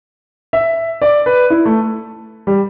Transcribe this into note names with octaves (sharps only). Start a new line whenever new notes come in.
E5
D5
B4
E4
A3
G3